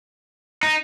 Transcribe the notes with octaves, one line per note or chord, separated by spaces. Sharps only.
D#4